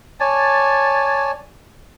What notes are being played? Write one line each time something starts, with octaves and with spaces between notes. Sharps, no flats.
C#5 D5 G#5 A5